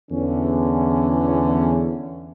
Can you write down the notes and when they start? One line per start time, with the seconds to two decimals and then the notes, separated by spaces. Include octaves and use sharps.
0.11 E2 D3 E3 C#4